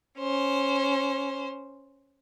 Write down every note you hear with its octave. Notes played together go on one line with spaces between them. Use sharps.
C#4 C5